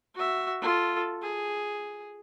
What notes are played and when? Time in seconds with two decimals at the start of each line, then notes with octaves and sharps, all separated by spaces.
0.15 F#4 E5
0.62 F4 A4
1.22 G#4